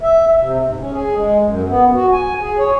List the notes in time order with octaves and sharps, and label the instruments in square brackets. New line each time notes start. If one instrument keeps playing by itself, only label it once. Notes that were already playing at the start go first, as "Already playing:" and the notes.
[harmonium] E5
C3
G#2
C#4
G#4
G#3
F#2
B3
F#4
G#5
G#4
C#5